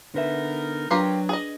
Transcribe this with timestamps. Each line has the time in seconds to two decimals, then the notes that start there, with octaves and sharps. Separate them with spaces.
0.14 D3 B3 D#4 A#4 B4 E5
0.91 F#3 D4 F4 G4 A#4 B4
1.29 G#4 D#5